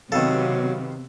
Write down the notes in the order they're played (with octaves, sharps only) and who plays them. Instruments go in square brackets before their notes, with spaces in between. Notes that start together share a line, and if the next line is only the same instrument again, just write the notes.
[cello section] C3 [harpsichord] D#3 A4 [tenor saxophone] F#3 [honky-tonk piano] B3 F5